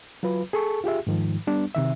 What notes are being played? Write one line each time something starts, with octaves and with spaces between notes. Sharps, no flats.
F#3 F4 B4
G#4 A4 A5 C#6
F4 G4 G#4 E5
G#2 D#3 F3
G3 B3 D4
C3 D#3 E5